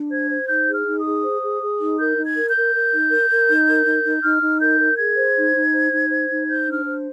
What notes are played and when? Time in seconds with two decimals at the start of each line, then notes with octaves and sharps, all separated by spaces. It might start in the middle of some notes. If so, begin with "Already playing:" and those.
Already playing: D4
0.11 C5 G#6
0.29 C5
0.48 D#4 G6
0.68 G#4
0.73 F6
0.86 D#4
0.99 D#6
1.06 G#4
1.24 C5
1.42 G#4
1.61 G#4
1.80 D#4
1.99 A#4 G6
2.17 D#4
2.24 G#6
2.36 A#4
2.48 G6
2.55 A#4
2.74 A#4
2.93 D#4
3.11 A#4
3.30 A#4
3.48 D#4
3.67 A#4
3.86 D#4
4.05 D#4
4.23 D#4 F6
4.42 D#4
4.60 A#4 G6
4.80 A#4
4.98 G#4 G#6
5.17 C5
5.36 D#4
5.54 D#4
5.73 C5
5.92 D#4
6.11 C5
6.30 D#4
6.49 C5 G6
6.66 D4
6.73 F6
6.86 C5